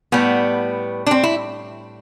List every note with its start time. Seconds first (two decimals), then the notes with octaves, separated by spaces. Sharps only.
0.12 A2 G3 B3
1.06 D4
1.11 C4
1.23 E4